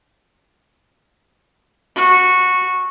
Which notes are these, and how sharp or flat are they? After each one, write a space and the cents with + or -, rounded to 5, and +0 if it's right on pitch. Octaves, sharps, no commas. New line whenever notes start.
F#4 -10